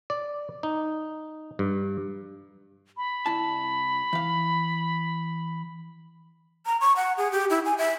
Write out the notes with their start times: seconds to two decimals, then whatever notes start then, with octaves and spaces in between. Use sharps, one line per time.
0.10 D5
0.63 D#4
1.59 G2
2.97 B5
3.26 C2 E4 A5
4.13 E3 F5
6.66 A#5
6.81 C#6
6.96 F#5
7.17 G#4
7.32 G4
7.50 E4
7.65 G#5
7.78 E5